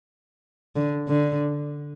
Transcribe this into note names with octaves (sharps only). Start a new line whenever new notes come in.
D3
D3